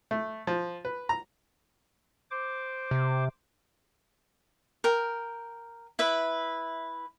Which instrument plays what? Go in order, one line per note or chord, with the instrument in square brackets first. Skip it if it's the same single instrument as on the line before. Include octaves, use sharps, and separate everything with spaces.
[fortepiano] A3
F3
B4
A#5
[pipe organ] C5 D6
[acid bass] C3
[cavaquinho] A#4 G5
E4 B4 E5